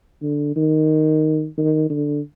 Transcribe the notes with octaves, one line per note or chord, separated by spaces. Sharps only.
D3
D#3
D#3
D3